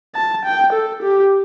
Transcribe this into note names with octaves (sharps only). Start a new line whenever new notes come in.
A5
G5
A4
G4